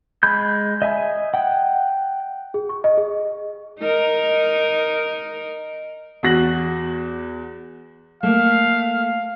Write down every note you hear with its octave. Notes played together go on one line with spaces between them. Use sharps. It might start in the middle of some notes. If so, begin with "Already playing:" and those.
G#3 B5 G6
D#5 E5 G#5
F#5 G5
G#4
C#6
D#5
G#4
D#4 A#4
E2 F#4 A#6 F#7
A3 A#3 F5